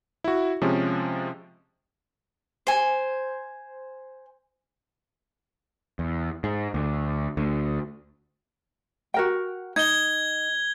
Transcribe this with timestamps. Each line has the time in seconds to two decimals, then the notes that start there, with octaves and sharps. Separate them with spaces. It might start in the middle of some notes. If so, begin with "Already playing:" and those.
0.24 E4 F#4
0.61 C3 F3 G#3 C#4
2.67 C5 G#5
5.99 E2
6.44 G#2
6.74 D2
7.37 D2
9.14 F#4 A#4 G5
9.76 D#4 G#6 G7